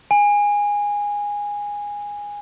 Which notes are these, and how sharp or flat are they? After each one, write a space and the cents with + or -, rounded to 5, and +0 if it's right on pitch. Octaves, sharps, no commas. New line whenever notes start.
G#5 -15